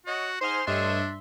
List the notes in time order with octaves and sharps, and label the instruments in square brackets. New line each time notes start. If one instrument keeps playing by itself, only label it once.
[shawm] F#4 [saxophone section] C#5 D#5 F#5
[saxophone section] D#4 G#4 F#5 [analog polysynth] C5 G#5 F6 [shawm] C6
[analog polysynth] G2 E5 C6 [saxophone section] A3 C#5 D#5 [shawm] D4